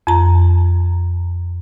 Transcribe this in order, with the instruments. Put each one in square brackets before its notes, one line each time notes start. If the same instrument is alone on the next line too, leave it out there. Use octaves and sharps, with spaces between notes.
[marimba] F2 A#5